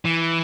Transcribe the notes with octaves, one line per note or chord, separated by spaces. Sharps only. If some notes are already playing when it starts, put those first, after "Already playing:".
E3